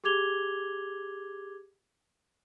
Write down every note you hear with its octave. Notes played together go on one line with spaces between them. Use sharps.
G4 G#4 D6 G#6 F7 G7